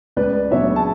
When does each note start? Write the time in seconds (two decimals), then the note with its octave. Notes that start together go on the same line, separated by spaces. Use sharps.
0.17 C#2 B4 D5
0.51 C#3 F#3 B3 D4 C#5 E5
0.76 A5